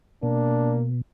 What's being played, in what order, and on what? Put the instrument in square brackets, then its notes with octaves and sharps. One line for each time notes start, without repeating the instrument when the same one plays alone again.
[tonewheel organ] B2 [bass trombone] A#3 [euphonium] D4